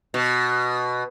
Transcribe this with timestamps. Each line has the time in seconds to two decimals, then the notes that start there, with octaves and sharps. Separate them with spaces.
0.14 B2